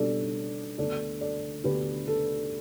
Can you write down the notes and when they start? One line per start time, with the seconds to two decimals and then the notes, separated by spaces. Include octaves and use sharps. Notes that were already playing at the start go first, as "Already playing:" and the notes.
Already playing: B2 G3 D4 A4 D5
0.78 D2 D3 B3 D4 A4 D5
1.21 A4 D5
1.64 D2 D3 B3 D4 G4 B4
2.07 A4